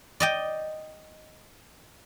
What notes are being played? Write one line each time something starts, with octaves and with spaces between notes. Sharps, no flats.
D5 D#5 G5